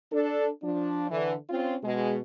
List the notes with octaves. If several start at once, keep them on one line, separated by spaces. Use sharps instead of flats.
D4 A4
F3 D4
D3 E3
C4 C#4 F4
B2 G#3